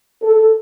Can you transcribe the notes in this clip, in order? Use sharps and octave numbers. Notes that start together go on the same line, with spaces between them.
A4